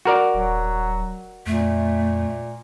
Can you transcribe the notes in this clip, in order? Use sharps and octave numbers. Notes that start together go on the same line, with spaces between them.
F#4 A#4 D5
D#1 F#3
F2 A#2 A3